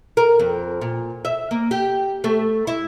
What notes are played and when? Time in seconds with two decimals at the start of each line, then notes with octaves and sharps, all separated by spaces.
0.17 A#4
0.39 F2
0.82 A#2
1.25 E5
1.51 A#3
1.71 G4
2.24 A3
2.67 E4